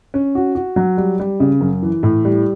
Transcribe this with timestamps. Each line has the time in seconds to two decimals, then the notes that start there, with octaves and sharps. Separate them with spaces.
0.14 C#4
0.35 F#4
0.55 F#4
0.76 F#3
0.97 G3
1.19 G3
1.40 C#3
1.61 F#2
1.83 E3
2.03 A2
2.25 G3